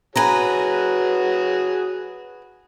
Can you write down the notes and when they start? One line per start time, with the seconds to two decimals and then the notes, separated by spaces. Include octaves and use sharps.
0.16 F#4 G#4 B4 C#5 G#5 A#5